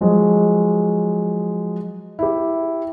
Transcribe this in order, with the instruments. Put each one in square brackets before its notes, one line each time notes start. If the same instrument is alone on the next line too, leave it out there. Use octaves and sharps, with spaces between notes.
[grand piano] F3 F#3 G#3
E4 G4